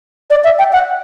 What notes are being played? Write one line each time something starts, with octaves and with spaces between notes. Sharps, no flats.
D5
E5
G5
F#5